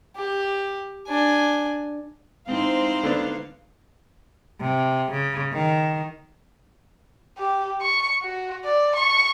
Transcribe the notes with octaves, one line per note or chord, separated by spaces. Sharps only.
G4
D4 G#5
G#3 C4 D#4 E4 C5 F5
D3 B3 D4
C3
C#3
D#3
G4
C#6
F#4
D5
C#6